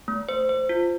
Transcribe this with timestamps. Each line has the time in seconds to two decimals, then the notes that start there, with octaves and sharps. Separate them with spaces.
0.08 A3
0.29 C5
0.49 C5
0.69 F4